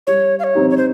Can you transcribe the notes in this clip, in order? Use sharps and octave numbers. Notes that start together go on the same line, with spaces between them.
G3 C#5
F5
C#5
C4 D#4 G4
C#5
C5